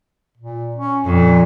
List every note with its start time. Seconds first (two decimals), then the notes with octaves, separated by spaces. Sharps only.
0.38 A#2
0.76 C#4
1.05 F2 A#2